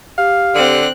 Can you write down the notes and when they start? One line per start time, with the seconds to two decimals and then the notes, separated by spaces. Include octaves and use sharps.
0.18 G4 F5
0.55 D3 C4 F#6